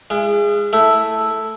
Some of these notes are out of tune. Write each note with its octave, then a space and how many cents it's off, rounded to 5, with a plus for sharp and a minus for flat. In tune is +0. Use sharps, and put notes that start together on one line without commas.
G#3 -15 E4 +45
A3 +0 E4 +0